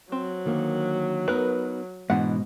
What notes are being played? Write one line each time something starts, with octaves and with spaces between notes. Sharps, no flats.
F#3 C4
D3 D#3 A#3
B3 D#4 A#4 B4
G#2 B2 E3 D4 F#5